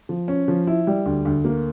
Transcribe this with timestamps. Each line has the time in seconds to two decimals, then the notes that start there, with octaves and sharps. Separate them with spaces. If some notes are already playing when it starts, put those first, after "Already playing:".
0.09 F3
0.28 C#4
0.48 F3
0.67 E4
0.87 G3
1.06 D2
1.25 D2
1.45 A#3